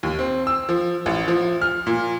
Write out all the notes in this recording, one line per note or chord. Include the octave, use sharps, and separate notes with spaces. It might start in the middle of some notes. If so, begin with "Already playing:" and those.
D#2
C4
E6
F3
A1
F3
F6
A#2